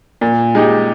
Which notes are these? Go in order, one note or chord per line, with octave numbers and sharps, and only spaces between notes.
A#2
G#3 D#4 G4